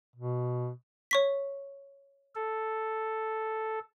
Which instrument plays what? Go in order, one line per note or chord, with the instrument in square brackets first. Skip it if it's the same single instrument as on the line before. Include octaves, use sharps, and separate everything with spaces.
[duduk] B2
[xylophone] C#5 C#6 B6
[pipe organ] A4